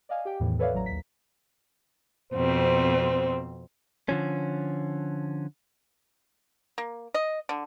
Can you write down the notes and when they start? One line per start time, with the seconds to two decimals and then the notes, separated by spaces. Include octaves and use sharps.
0.09 D5 D#5 F5 G#5
0.25 G4 G5
0.40 E2 A2 D#3 E3
0.59 A4 B4 C#5 D5 E5 F5
0.73 A1 F#3 A#5
0.86 D#2 B6
2.33 F2 B2 C4 C5
4.09 D3 F3 C#4
6.78 A#3
7.14 D#5
7.49 D3